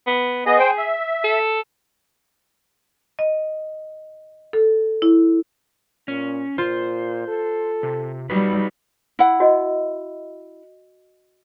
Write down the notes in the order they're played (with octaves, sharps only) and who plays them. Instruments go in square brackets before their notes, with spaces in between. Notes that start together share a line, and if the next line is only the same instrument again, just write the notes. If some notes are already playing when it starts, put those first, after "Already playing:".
[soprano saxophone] B3
[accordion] B3 D#5 [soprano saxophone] G#4
[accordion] C5 G5
E5
[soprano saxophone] A4
[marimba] D#5
A4
E4
[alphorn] A#2 [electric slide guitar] C#4
[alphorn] A#2 [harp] F4 [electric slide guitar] C5
[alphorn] A4
[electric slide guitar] C3
[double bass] G3 [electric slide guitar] D#4 F#4 B4
[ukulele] E4 F#5
[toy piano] F#4 D#5